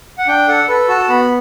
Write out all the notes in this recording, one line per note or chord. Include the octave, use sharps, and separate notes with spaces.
F#5
D4 G5
A4 F#5
A4 B4
F#4 A5
B3 B5